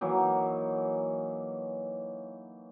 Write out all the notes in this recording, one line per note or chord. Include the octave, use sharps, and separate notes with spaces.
E3 F#3 A#3 D#4